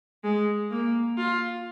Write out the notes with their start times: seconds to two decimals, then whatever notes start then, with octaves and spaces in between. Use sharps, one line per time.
0.24 G#3
0.71 A#3
1.18 F4